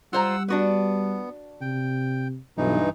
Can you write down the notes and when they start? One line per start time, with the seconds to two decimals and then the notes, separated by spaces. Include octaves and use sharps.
0.13 G3 F4 C5 F#5 A#5 E6
0.48 B3 D4 F#4 B4
1.61 C3 G5
2.58 B1 G2 E3 D#4